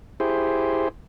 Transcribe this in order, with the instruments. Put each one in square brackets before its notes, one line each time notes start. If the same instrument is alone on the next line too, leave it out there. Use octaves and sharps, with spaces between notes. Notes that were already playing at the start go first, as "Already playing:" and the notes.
[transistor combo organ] E4 G4 G#4 C5